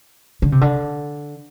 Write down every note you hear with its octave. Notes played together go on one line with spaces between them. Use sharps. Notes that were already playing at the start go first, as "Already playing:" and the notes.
D3
C3
D3